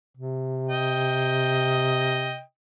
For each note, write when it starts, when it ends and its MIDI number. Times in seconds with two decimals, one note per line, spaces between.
0.17 2.40 48
0.69 2.41 75
0.69 2.41 79